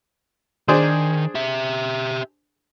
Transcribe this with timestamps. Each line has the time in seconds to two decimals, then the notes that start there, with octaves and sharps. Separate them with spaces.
0.68 D#3 D4 G#4 C5
1.35 G4 E5